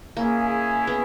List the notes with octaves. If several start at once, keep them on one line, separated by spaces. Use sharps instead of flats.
A#3 C#4 E4 G#4
B3